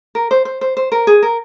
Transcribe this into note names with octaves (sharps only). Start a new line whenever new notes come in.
A#4
C5
C5
C5
C5
A#4
G#4
A#4